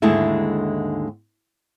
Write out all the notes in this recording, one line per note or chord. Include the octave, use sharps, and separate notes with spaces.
D#2 G#2 D3 G#3 A3 E4